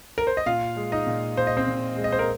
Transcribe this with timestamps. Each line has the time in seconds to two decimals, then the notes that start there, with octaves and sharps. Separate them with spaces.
0.18 A#4
0.27 C5
0.37 D#5
0.46 A#2 F4 F5
0.76 G#3
0.92 D#4 D#5
1.07 A#2
1.37 A#2 C5
1.47 D#5
1.57 C4 C5
1.68 A#2
1.96 G#3
2.04 D#5
2.12 C5
2.19 A#4